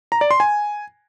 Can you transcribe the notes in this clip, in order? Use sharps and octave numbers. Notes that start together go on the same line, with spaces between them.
A#5
D5
C6
G#5